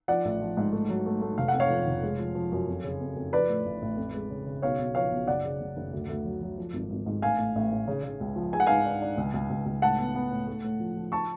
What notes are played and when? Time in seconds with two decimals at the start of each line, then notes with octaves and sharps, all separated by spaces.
0.08 F3 D5 F#5
0.25 A1
0.41 F3
0.57 G#2
0.72 A3
0.89 F#3
1.06 A3
1.22 A3
1.38 F1 F5
1.48 F#5
1.54 F2
1.60 C#5 F5
1.70 F3
1.87 F1
2.03 G#3
2.19 F3
2.35 F3
2.52 F#2
2.68 F2
2.84 C#3
3.01 F2
3.16 F2
3.33 F3 B4 D5
3.49 A2
3.66 A1
3.82 A1
3.97 F2
4.14 G#3
4.30 C#3
4.46 C#3
4.62 B1 C#5 F5
4.79 B1
4.95 F3 C#5 F5
5.12 B1
5.27 F#1 D5 F#5
5.44 C#3
5.60 F#1
5.77 F#1
5.93 D2
6.09 D2
6.25 F#3
6.42 F#3
6.58 F3
6.74 G#1
6.90 G#1
7.06 G#2
7.22 A1 F5 G#5
7.38 A2
7.55 A1
7.72 A2
7.88 C#3
8.03 C#3
8.20 C#2
8.36 F3
8.53 G#3 G#5
8.60 F#5
8.67 G#2 F5 G#5
8.85 D4
9.02 D4
9.17 C#2
9.34 C#2
9.50 C#2
9.66 C#2
9.82 A2 F#5 A5
9.98 B3
10.15 B3
10.31 A2
10.47 A3
10.64 A2
10.80 F3
10.97 F3
11.12 A5 C#6